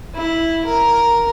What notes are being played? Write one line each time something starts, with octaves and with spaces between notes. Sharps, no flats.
E4
A#4